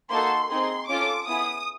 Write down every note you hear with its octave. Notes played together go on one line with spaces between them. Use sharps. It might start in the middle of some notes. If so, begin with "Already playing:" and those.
A#3 D#4 F#4 A4 C6
C4 D#4 G#4 C6
C#4 F4 A4 D6
B3 E4 G#4 D#6